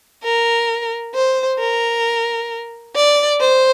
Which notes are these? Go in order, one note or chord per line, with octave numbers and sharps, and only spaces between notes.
A#4
C5
A#4
D5
C5